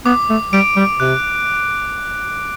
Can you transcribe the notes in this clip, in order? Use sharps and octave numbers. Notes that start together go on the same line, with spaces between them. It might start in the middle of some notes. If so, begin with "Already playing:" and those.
B3 D6
A3
G3 D7
G3
C3 F#6